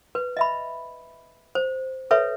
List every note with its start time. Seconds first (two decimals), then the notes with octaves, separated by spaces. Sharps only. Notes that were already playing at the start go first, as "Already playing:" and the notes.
0.15 B4
0.37 D#5 E5 B5
1.55 C5
2.11 A4 B4 C#5 E5